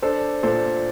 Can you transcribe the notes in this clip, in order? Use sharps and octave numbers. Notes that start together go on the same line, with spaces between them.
D4 A4 C5
A#2 A4 C5